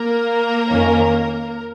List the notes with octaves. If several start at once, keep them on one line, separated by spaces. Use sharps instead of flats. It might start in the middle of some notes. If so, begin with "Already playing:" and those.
Already playing: A#3 A#4
F2 D#3 C#4